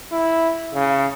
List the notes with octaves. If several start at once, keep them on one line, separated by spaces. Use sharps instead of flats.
E4
C#3